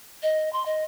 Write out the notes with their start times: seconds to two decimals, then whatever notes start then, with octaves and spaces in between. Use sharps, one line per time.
0.23 D#5
0.53 C6
0.66 D#5